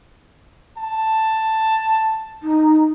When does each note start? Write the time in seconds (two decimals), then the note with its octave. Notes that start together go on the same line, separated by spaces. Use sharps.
0.77 A5
2.43 D#4